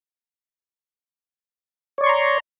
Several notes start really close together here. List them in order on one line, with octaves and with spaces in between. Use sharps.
C#5 D5 C#6 C6 A#5